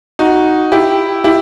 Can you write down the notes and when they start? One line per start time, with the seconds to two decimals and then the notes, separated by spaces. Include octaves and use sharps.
0.19 D#4 F#4
0.72 E4 G4
1.24 E4 G4